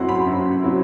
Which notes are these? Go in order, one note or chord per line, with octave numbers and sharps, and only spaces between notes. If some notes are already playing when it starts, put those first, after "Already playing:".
Already playing: F#2 F#3 C4 E4 F#5 C6
B5
F#2
F#3 C4 E4